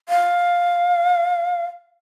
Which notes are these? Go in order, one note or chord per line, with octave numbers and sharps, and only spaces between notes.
F5